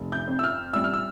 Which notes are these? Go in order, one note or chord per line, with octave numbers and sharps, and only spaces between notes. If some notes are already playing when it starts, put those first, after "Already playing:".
Already playing: F1
G6
F2
E6
F6
G3 E6
F6
E6